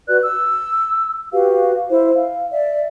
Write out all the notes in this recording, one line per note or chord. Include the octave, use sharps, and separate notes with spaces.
F#4 B4 D5 F#6
E6
F#4 G4 B4 F5
E4 C5
F5
D5 E5